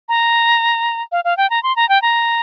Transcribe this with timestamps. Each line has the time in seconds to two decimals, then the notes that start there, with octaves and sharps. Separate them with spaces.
0.09 A#5
1.12 F5
1.25 F5
1.37 G5
1.50 A#5
1.63 C6
1.76 A#5
1.89 G5
2.02 A#5